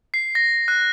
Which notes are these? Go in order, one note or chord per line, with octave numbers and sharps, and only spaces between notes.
C7
A#6
F#6